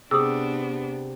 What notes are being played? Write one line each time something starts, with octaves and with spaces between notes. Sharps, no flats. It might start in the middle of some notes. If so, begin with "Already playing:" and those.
C3 B3 D4 G#4 D#6 E6